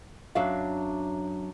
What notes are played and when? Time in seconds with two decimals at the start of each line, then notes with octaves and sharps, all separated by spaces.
0.35 F#2 F#3 D4 E5 F5